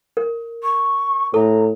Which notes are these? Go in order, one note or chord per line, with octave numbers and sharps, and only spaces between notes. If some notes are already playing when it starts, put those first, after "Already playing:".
A#4
C#6
A2 A4 A#5